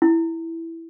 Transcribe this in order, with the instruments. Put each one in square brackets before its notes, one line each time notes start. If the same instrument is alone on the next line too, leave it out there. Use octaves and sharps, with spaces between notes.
[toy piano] E4